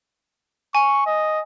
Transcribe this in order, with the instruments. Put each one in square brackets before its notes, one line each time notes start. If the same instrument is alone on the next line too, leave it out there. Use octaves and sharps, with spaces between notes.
[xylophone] G#5 [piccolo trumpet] C#6
[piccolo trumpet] D#5